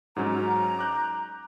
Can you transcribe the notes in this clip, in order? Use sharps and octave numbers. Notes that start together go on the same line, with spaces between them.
G#2 F#3 C#4 A#5
D6 F#6 G6